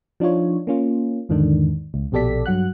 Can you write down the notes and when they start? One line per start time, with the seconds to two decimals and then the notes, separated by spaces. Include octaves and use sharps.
0.20 F3 D4 D#4 F4 C#5
0.67 A#3 C#4 F4
1.29 E2 G#2 D3 D#3 D4
1.94 C#2
2.12 A#1 B2 G4 A4 D5 B6
2.46 G2 F#3 F#5 F#6